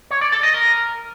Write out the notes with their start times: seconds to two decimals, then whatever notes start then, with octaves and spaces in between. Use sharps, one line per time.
0.11 C#5
0.21 D5
0.32 A4
0.43 D#5
0.54 A#4